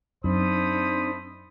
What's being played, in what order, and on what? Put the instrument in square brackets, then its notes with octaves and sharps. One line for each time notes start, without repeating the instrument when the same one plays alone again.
[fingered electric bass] F#2 [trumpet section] A3 B5 D#6 [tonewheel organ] C4 D4 D#4 [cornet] C5